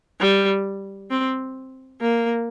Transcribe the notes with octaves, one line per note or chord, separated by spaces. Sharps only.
G3
C4
A#3